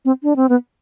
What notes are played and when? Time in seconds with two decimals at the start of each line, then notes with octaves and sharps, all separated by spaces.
0.05 C4
0.23 D4
0.36 C4
0.49 B3